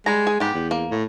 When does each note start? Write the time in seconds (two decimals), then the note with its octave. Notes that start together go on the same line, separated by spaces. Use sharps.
0.06 G3 G#3 A#5
0.27 G#4
0.40 G#2 B3 G4 G5
0.54 E2
0.71 A#3
0.91 A2